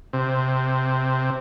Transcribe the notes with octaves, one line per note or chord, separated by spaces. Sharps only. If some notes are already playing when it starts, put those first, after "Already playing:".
C3